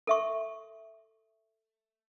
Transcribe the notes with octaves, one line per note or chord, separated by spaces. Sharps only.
A4 E5 C#6